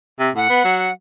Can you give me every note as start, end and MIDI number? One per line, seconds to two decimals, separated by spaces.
0.19 0.30 48
0.36 0.49 45
0.36 0.90 78
0.50 0.63 59
0.64 0.89 54